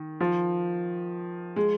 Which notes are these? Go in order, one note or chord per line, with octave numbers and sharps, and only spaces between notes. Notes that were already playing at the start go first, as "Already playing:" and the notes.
Already playing: D#3
F3
G#3